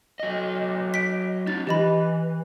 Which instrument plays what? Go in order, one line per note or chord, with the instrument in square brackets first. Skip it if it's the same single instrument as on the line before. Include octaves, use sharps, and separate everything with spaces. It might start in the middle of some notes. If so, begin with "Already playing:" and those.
[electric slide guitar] F#3 D#5
[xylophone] B6 D7
[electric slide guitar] D#4 F4 [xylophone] A6
[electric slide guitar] E3 [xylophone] G4 D#5 B5